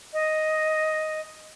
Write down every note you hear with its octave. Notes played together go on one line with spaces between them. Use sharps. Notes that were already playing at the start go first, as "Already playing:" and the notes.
D#5